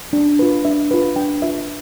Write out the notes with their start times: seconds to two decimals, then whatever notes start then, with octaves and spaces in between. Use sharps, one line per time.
0.13 D4
0.39 F4 B4
0.65 D4 E5
0.91 F4 B4
1.16 D4 G5
1.42 F4 B4 E5